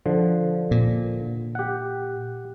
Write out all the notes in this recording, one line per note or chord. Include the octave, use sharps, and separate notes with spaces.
D3 F3
A#2
G4 F#5